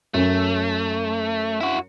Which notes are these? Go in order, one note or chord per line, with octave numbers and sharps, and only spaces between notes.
F#2 A3 C#4
E4 F#4